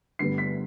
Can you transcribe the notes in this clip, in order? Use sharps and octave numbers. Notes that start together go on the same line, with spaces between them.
G2 D3 G3 B3 C7
B6